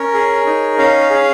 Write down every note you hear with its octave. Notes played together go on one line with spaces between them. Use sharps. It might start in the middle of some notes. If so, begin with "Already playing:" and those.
Already playing: C#4 A#4 C#5
G#4
D#4
C#4 C#5 F5
G#4